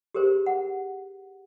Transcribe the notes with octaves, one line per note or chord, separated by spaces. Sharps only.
G4 G#4 A#4 C5
F#5